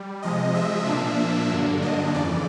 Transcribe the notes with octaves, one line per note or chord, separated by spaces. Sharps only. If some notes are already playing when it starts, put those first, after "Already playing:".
Already playing: G3
C3 F3 G#3 D#5
E5
A#2 F3 A#3 D4
G2 D3 F#3 A#3 D4
D#5
F2 C#3 E3 D5